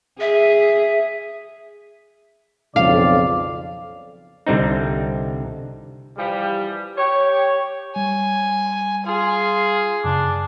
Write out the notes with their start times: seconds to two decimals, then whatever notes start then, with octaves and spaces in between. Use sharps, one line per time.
0.20 G#4 E5
2.76 B1 F2 C#3 D5 F5
4.47 C2 D3 G3 C4 D#4
6.18 E3 F3 G3
6.98 G4 C#5
7.96 G3 G#5
9.06 F4 G#4
10.04 F#2 C#3 D4